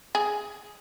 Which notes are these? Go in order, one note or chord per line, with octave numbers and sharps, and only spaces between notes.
G#4